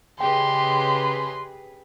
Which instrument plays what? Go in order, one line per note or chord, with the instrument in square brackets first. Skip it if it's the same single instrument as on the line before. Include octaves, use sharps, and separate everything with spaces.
[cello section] C#3 G#4 B4 [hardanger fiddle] G4 D#5 [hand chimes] G5 [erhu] C6